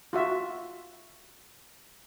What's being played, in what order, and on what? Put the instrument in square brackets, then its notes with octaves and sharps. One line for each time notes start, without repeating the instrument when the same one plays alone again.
[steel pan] F4 F#4 E5